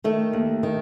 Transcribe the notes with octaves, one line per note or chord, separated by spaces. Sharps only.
D#3 A3
D#2
D#3